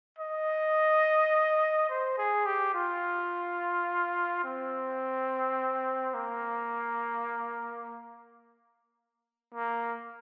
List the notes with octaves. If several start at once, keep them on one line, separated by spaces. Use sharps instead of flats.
D#5
C5
G#4
G4
F4
C4
A#3
A#3